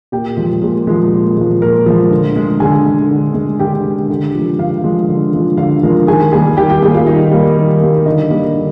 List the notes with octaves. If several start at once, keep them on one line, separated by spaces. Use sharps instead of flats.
A#2 G4 G5
F3 G#3
A#2 G#4
F3 G#3
A#2
F3 G#3
A#2 A#4
F3 G#3
D3
G#3
D3 G#4 G#5
G#3
D3
G#3
D3 G4 G5
G#3
D3
F3 G#3
D3 F4 F5
F3 G#3
D3
F3 G#3
D3 F4 F5
F3 G#3 A#4
D#3 G#4 G#5
G3 A#3 G#4 G#5
D#3 G4 G5
G4 G5
G3 A#3 G#4 G#5
F4 F5
D#3 D#4 D#5
G3 A#3
D#3
G3 A#3
D3 D#4 D#5
G3 A#3
D3